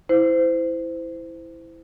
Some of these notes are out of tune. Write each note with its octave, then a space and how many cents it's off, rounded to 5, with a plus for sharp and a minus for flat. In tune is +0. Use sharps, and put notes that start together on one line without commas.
E4 +0 C5 -25